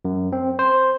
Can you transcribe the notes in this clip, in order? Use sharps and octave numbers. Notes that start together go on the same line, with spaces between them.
F#2
C4
C5